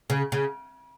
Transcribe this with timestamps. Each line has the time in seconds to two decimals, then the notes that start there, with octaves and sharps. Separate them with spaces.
0.10 C#3
0.32 C#3